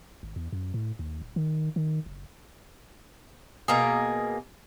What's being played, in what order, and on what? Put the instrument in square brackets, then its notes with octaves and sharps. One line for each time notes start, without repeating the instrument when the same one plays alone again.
[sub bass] G#1
E2
F#2
A2
D#2
D1
D#3
D#3
F#1
[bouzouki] B2 A#3 G#4